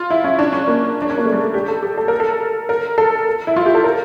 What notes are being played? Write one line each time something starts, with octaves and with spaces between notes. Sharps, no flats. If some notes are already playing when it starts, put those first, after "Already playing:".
Already playing: F4
E4
C#4
D4
C#4
A#3
D4
C#4
A#3
A3
G3
A3
G4
A4
G4
A4
A#4
A4
A#4
A4
E4
F4
G4
A4
A#4